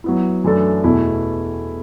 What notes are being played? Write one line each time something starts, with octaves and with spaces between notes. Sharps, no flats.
F#3 B3 E4
F#2 E3 A3 D4 A4
E2 B2 A3 E4